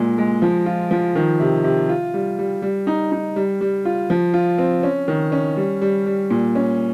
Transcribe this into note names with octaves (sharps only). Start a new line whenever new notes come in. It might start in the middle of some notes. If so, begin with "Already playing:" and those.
Already playing: A#2 G#3
G#3
F3
F4
F3
D#3
C3
C3
F4
G3
G3
G3
D#4
D#4
G3
G3
F4
F3
F4
C4
C#4
D#3
C#4
G3
G3
G3
A#2
C#4